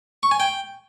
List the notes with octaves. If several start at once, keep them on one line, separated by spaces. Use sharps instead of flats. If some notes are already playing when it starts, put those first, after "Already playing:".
C#6
G#5
G5